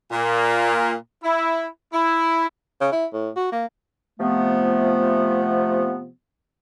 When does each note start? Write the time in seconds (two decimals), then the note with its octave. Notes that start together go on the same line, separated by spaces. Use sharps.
0.12 A#2 A#3
1.23 E4
1.93 E4
2.81 C#3
2.92 E4
3.13 A2
3.36 F#4
3.52 A#3
4.20 C3 F3 A3 B3